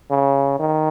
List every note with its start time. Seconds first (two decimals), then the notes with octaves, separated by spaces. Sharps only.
0.10 C#3
0.59 D#3